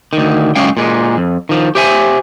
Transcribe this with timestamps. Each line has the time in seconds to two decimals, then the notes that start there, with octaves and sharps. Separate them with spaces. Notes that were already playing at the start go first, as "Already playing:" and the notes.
0.13 D2 D#3
0.55 F#2 G#3 C#4 F5 G5
0.77 A#2 G#3
1.17 F2
1.49 D#3 F3
1.75 G4 C5 E5 G#5